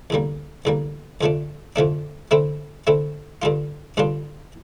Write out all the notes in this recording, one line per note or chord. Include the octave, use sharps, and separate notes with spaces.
E2 D3 G3 A#3
E2 D3 G3 A#3
F2 D3 F3 A3 D4
F2 D3 F3 A3 D4
D3 A3 C4 E4
D3 A3 C4 E4
G2 D3 G3 D4 F4
G2 D3 G3 D4 F4